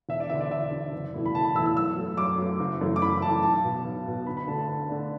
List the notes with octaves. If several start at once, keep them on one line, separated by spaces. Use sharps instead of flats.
E1 E5
D5
D2 D3 E5
D5
E1 E5
D2 D3
F#1
E2 B2 A3 E4
B5
F#1 A5
B5
E2 B2 A3 E4 E6
E6
F#2 E6
F#3 A3
F#2 D6
F#3 A3
F#1
F#2 E3 A3
D6
F#1 B5
F#2 E3 A3 A5
B1 A5
B2 B3
B1
B2 B3
D2 B5
B5
D3 A3 D4 A5
A5
D2
D3 A3 D4